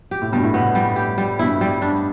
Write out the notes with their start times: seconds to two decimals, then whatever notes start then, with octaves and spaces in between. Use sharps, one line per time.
0.11 G4
0.22 A2
0.32 G2 B2 G3
0.43 A2
0.54 A2 B3
0.75 G3
0.96 G4
1.18 G3
1.39 G2 B2 E4
1.61 G3
1.82 D4